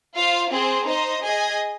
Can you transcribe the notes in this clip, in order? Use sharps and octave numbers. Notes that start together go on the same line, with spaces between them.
F4 C5 F5
C4 G#4 C5
D#4 C5 D#5
G#4 D#5 G#5